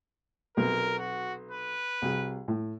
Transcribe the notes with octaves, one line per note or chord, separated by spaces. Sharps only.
B1 C3 A#4
F#4
B4
C2 F#4 G#4
A2